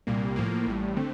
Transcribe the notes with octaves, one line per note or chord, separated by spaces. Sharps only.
C2 A#2 G3 A#3
A2 F3 A#3
A1 A2 G3
D3 A3 C4